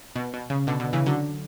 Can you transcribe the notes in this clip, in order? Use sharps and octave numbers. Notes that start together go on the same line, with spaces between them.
B2
B2
C#3
B2 D3
B2 D3
C#3 E3
D3 F#3